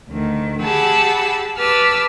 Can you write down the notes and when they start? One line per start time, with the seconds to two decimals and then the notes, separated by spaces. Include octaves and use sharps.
0.10 D2 D#3
0.63 G4 G#4 F#5 A5 B5 E6
1.57 G4 B4 A5 D6 E6 F6